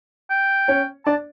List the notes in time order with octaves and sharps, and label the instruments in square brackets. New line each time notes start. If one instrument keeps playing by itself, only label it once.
[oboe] G5
[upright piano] C#4 C#5
[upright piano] D4 D5 [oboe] A5